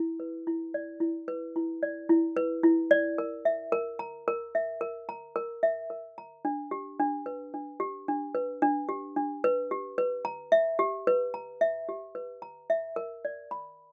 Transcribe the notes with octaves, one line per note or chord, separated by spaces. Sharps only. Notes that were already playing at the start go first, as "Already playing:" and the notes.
Already playing: E4
B4
E4
D5
E4
B4
E4
D5
E4
B4
E4
D5
A#4
E5
A#4
A#5
A#4
E5
A#4
A#5
A#4
E5
A#4
A#5
D4
G4
D4
B4
D4
G4
D4
B4
D4
G4
D4
B4
G4
B4
A#5
E5
G4
B4
A#5
E5
G4
B4
A#5
E5
A#4
D5
B5